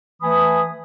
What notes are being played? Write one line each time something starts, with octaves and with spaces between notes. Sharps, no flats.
E3 A3 G#5 B5 D#6